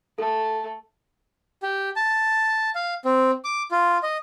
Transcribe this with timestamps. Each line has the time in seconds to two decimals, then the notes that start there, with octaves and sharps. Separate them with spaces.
0.19 A3 A4
1.62 G4
1.96 A5
2.75 F5
3.05 C4
3.45 D6
3.71 F4
4.03 D#5